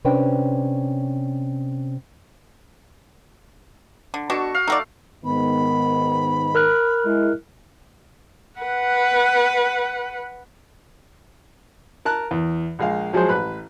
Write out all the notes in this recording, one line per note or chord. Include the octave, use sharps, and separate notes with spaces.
C3 C#4 D4 B4 C5 G5
D3
B2 D4 F#4 A4 C#6
F5
A3 D#4 F#4 D5
G#2 D#3 B3 B5
A#4 F6 F#6
G#3 E4
B4 F#5
A#4 A5 F#6
E2
A#1 G#3 F5
F3 F#3 G#3 G#4 C5
A1 B4 B5 F#6